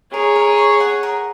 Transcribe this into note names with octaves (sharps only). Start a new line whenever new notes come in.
G#4 A#4 C#5
A#4
C#6
F#5
A#4